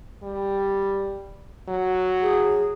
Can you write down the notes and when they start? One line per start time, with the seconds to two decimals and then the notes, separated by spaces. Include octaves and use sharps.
0.23 G3
1.68 F#3
2.22 G#4